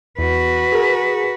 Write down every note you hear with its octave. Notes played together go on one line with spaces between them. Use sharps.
E2 F#4 B4
G#4 A#4